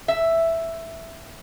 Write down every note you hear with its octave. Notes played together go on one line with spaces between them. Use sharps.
E5